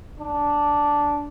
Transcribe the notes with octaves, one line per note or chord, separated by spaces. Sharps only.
D4